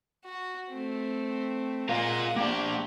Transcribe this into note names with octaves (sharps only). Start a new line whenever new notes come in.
F#4
A3 C4
G#3 F4 A#4 F5 F#5
A#3 D4 G4